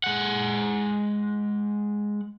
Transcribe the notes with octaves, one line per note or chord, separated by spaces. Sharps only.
G#3 F#5